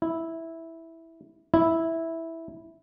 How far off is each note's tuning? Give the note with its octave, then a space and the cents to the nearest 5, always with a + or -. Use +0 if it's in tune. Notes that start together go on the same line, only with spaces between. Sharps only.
E4 -5
E4 -5